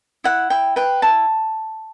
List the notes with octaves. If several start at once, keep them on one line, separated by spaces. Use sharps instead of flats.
E4 F#5
E4 G5
B4 G5
E4 A5